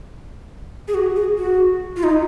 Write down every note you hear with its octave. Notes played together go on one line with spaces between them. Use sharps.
G#4
F#4
G#4
F#4
F4
D#4